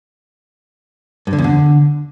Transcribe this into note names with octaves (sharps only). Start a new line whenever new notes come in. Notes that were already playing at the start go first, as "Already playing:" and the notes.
G2
D3
E2
D3